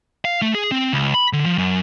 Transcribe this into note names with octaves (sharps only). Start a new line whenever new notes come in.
F5
A3
G#4
C4
C#2
B5
D3
F3
F#2